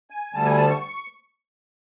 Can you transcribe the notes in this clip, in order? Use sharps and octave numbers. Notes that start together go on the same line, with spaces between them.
G#5
D2 D3 G3 A5
G#5
A5
C#6
C#6